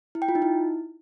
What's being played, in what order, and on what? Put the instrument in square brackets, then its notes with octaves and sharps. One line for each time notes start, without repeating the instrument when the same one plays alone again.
[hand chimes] E4
G5
F4
D#4
E4